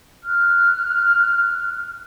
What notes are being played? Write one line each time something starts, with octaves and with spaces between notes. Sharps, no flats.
F6 F#6